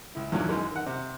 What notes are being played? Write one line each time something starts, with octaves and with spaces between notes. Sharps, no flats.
C#2 E4
E2 G2 A#2 D#3 F3 F#3
F#2 D#3 E3 G#3
D#3 F#5
C3